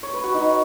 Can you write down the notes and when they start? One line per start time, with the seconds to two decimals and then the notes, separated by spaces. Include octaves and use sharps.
0.03 C#5
0.14 B4
0.24 F#4
0.34 D#4